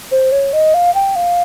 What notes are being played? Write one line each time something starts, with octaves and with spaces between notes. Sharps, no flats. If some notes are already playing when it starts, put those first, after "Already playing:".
C5
C#5
D#5
F5
G5
F5